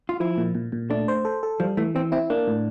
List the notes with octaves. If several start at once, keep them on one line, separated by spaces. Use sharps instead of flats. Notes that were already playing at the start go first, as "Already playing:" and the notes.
F4
F3 E4
A#2
A#2
A#2
A3 D4
C5
A4
A4
F3 G3
E3 A3
E3 C4
C4 E4
A#3 D4
A2